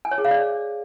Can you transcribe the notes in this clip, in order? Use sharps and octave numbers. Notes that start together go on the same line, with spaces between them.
G#5
C#5
G#4
F5
D5